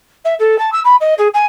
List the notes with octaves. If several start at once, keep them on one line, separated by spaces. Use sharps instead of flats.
E5
A4
A5
E6
B5
D#5
G#4
G#5